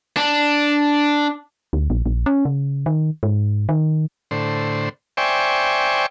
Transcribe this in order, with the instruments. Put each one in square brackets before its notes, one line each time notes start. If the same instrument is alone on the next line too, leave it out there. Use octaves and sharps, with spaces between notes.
[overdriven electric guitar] D4
[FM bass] D2
A#1
A#1
C#4
C#3
D#3
G#2
D#3
[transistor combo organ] A2 D3 C5
C5 D5 E5 G5 G#5 C#6